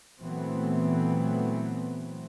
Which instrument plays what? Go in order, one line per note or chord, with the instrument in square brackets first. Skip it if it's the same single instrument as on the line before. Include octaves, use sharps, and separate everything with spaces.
[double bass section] A#2 E3 F#3 A3 B3 C4